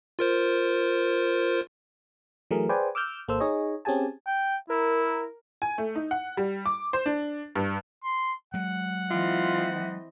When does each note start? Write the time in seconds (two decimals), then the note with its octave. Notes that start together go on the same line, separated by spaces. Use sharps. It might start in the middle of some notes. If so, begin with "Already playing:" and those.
0.19 F4 A#4 C5
2.51 E3 F#3 A3 G#4 A#4
2.69 G#4 B4 C5 D5 G5 G#5
2.95 D6 E6 F6 G6
3.28 G#1 A#3 A4 C5 E6
3.40 D#4 G#4 C#5 D#5
3.85 C4 C#4 G4 G#4 G#5 A5
4.26 G5
4.70 E4 A#4
5.62 G#5
5.78 A3
5.95 D#4
6.11 F#5
6.37 G3
6.66 D6
6.93 C5
7.06 D4
7.56 G2
8.04 C6
8.54 F#3 G#3 F#5
9.11 E3 C4 F4 D#5